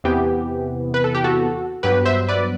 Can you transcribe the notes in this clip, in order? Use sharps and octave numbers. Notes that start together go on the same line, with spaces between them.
E2 C3 E3 B3 G4
B4
A4
G4
F#4 A4
G2 F#3 B3 G4 B4
C5 E5
B4 D5